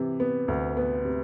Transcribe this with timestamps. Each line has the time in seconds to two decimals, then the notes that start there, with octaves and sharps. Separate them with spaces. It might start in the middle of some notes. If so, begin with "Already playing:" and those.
Already playing: C3 E3
0.20 B3
0.48 D2
0.77 B3
1.05 C3